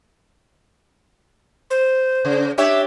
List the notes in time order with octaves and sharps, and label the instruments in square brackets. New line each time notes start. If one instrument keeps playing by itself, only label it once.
[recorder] C5
[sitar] C#3
[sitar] D4 G4 C#5 [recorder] E5